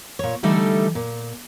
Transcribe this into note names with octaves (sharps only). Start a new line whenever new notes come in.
A#2 C#5
D3 E3 G3 A3 D#4 A4
A#2